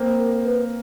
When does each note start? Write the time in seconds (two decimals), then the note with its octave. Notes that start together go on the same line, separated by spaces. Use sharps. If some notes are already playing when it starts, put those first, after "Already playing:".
Already playing: A#3 C4
0.19 A#4
0.44 B4